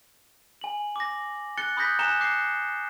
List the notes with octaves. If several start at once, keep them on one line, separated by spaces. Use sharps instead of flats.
G#5 F#7
D6 A#6
F#6 A6 C#7 G7
B5 D#6 F#6 G6 A#6 B6
G#5 A#5 F#6 C#7 E7 G7
D6 F#6 C7 C#7